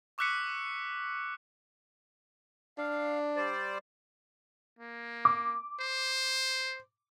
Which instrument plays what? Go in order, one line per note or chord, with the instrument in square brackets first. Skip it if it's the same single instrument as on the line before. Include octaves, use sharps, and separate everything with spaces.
[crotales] C#6 D6 E6 F#6 B6 C#7
[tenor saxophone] D4 [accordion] F5
[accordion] G3 C5 D5
[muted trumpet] A#3
[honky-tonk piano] D6
[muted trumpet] C5